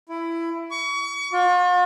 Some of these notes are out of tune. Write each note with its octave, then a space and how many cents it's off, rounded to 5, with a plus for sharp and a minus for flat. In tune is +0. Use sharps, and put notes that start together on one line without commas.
E4 +15
C#6 +35
F4 +45